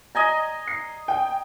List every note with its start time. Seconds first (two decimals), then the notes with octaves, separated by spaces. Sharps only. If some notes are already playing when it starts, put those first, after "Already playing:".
0.15 D#5 G#5 A#5
0.68 C7
1.08 G5 G#5